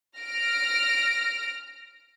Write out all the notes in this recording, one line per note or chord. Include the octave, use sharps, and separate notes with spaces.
F6 A#6 D7